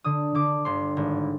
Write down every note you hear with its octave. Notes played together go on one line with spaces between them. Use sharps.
D3 D#6
D3 D6
G1 C6
G#1